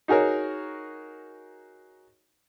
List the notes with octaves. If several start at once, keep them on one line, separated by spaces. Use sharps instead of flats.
D#4 F#4 G#4 A#4 C#5